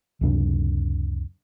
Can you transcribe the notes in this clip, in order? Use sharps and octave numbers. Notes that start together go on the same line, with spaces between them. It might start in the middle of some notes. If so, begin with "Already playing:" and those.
C#2 F#2 C3 D4